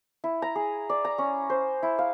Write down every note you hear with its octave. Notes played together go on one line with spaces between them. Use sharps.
E4
A#5
G#4
D5
A#5
C#4
C5
E4
F5